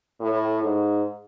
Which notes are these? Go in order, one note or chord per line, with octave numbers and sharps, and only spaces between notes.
A2
G#2